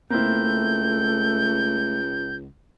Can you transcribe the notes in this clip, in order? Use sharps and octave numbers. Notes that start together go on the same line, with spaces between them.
C#2 A3 A#3 C4 E4 G6